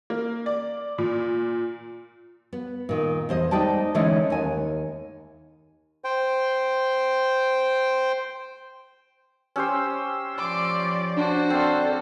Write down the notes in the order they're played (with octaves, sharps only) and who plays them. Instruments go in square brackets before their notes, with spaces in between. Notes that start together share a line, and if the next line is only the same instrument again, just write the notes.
[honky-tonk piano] A#3
D5
A#2
[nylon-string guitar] B3
A#2 D#3
E2 C5 D#5
G#3 D#4 C5 D5 G5 A5
D3 E3 G#3 A3 C#4 D#4
D#2 G#5
[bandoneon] C5 G5
[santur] C#4 G4 C5 [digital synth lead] E6
[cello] F3 D5 [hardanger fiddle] C6 D6
[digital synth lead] D4 [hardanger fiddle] F#4 C5
[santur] C4 F5 [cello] A4